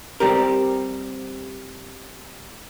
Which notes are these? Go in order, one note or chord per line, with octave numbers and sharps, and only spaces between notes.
G3 C4 G4 A#4